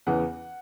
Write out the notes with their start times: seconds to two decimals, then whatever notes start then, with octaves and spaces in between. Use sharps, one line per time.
0.07 E2 C#3 E3 F#5